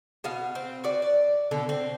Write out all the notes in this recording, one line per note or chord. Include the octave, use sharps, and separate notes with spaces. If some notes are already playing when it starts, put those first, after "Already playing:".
B2 B3 F5
C4
F#4 B4 D5
D5
B2 D3 D4
C4